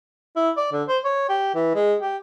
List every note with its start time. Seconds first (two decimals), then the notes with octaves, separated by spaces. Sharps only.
0.36 E4
0.57 D5
0.73 D3
0.88 C5
1.04 C#5
1.29 G4
1.55 E3
1.75 G#3
2.01 G4